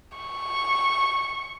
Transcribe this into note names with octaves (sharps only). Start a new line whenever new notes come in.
C#6